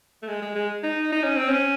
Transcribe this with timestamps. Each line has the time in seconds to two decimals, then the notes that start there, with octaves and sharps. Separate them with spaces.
0.22 A3
0.28 G#3
0.42 G#3
0.55 G#3
0.83 D#4
1.12 D#4
1.24 C#4
1.36 C4
1.49 C#4